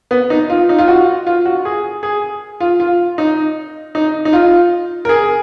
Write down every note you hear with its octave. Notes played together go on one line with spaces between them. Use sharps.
B3
D#4
F4
D#4
F4
F#4
F4
F#4
G#4
G#4
F4
F4
D#4
D#4
D#4
F4
A#4
G#4